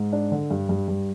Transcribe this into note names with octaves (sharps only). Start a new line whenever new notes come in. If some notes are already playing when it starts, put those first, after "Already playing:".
Already playing: G#2
D4
D3
G2
G2
G2